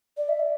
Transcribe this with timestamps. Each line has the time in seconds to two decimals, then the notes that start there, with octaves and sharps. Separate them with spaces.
0.17 D5
0.29 E5
0.40 D5